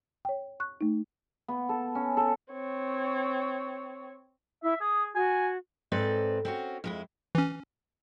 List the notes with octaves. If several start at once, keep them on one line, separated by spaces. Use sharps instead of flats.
C#5 G5
C#6 F#6
A3 D#4
B3
A4
C#4
A4
C4 C#5
E4 E5
G#4 D#6
F#4 G#5
G#2 C4 A4 B4 D5
C4 C#4 F#4
F2 G#3 E4
E3 C#4